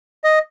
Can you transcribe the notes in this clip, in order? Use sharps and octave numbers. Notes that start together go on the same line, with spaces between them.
D#5